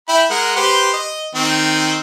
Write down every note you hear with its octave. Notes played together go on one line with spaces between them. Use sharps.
E4 G5 B5
G#3 A#4 F#5
G4 B4 C5
D#5
D#3 C4